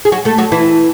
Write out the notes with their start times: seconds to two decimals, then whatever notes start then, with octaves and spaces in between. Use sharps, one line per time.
0.05 G#4
0.12 F#3 F#4
0.25 A3 A4
0.38 F#3 F#4
0.52 E3 E4